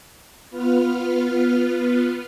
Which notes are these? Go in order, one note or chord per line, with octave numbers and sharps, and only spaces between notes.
B3 F4 B4 F6